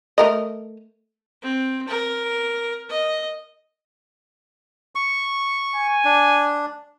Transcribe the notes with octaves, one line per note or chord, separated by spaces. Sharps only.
A3 A#4 D#5
C4
A#4
D#5
C#6
G#5
D4